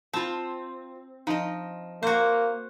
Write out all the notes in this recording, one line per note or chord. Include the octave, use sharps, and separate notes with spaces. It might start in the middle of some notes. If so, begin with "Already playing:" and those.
C4 F4 A5
F3 D#4 D#5
A#3 F#4 C5